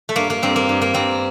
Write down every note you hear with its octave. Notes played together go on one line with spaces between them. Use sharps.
A3
G2 A#3
A#3
G2 C4
A#3
G2
A#3
G2 C4